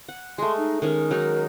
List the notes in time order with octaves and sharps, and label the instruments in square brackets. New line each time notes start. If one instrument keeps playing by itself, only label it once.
[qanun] F#5
[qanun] G#3 A3 [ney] C6
[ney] D#4
[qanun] D#3 G#3 C#4 [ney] A#4
[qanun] F#3 G#3 D#4